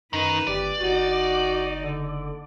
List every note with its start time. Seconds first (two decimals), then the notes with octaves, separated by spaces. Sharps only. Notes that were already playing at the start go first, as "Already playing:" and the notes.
0.13 F#2 D#3 D#4 B4
0.47 G1 G4 D5
0.80 F#1 D#4 F#4
1.81 D3